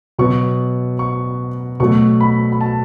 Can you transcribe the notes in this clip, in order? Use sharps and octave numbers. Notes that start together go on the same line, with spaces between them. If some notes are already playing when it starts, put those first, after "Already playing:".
B2 F#3 B3 C#6
C#6
B2 F#3 A3 C#6
B5
B5
A5